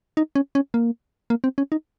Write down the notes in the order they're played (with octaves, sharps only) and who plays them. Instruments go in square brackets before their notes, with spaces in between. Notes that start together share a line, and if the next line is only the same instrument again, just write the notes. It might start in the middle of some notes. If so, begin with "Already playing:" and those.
[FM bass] D#4
C#4
C#4
A#3
A#3
C4
C#4
D#4